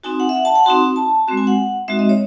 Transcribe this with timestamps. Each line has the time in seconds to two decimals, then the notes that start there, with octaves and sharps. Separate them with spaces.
0.04 C4 D#4 F#4 G#5
0.20 F#5
0.29 E5
0.35 F#5
0.45 A5
0.55 F#5
0.65 C4 D#4 F#4 C6
0.96 A5
1.28 G#3 C4 F#4
1.37 G#5
1.47 F#5
1.88 G#3 C4 D#4 F#4 E5
1.99 D#5
2.09 C#5